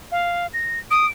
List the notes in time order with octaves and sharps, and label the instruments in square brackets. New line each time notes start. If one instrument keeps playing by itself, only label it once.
[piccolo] F5
A#6
[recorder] D#6 [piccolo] D7